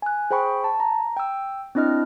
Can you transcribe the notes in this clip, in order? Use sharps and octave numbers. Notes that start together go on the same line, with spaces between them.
G#5 F#6
G#4 C5 G5 B5 C#6
A5
A#5
G5 E6
C4 D4 E4 D#5 F6